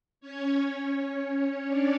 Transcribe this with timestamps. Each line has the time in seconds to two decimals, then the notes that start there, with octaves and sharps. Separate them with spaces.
0.21 C#4 C#5
1.18 C#4 C#5
1.67 D4 D5